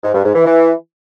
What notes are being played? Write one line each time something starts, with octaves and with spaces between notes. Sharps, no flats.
G#2
G2
G#2
E3
E3